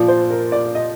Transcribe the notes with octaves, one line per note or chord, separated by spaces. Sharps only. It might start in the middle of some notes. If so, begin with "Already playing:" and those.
Already playing: A#2 F3 D5
C5
A#4
D5
D#5